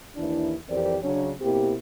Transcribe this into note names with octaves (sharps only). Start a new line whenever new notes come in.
D#2 E3 D4 E4
F2 E3 C4 G4 A#4 D5
C#3 F#3 C#4 D4
B2 A#3 C4 E4 G4